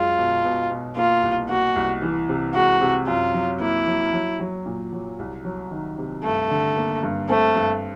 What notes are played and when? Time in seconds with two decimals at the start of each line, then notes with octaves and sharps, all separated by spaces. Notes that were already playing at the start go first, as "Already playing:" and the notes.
Already playing: F#2 G#3 F4
0.18 B2
0.44 B2
0.70 B2
0.96 A#3 F4
1.23 C2
1.49 A#3 F#4
1.76 C2
2.02 E3
2.29 C3
2.54 G#3 F#4
2.81 C3
3.07 F#2 F4
3.34 F#3
3.60 A#3 E4
3.87 F#3
4.13 F#3
4.40 F#3
4.66 A#2
4.92 F#3
5.19 C2
5.45 F#3
5.71 D#3
5.98 C3
6.24 G2 A3
6.51 D3
6.77 A#3
7.03 G2
7.29 A3 C4
7.56 G2